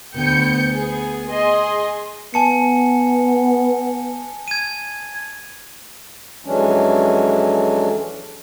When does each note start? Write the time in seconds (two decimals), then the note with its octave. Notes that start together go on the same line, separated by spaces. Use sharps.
0.14 D2 B3 G5 G6 C#7
0.71 B3 G#4
1.30 G#4 D#5 C6
2.34 B3 G#5 A5 C#7
4.48 G#6 D#7
6.45 F2 E3 F#3 G#3 C#4 D4